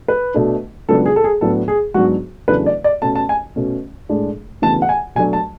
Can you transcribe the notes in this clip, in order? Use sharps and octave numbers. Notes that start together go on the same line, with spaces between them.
B4
B2 A3 D4
C#2 C#3 F#3 B3 D4 A4
G#4
A4
G#4
A2 F#3 B3 D4 A4
G#4
G#2 F#3 B3 D4 F#4
E2 C#3 F#3 A3 D4 B4
D5
D5
B2 A3 C#4 A5
A5
G#5
B2 A3 C#4
A2 G#3 D4
D2 C#3 E3 B3 A5
F#5
G#5
B2 F#3 A3 D4 G#5
A5